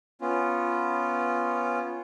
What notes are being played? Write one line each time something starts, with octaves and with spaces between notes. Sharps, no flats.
B3 C#4 F4